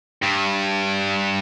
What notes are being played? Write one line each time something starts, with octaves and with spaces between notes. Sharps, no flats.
G2